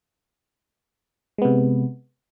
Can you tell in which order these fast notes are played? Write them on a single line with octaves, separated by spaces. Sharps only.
G#3 B3 C3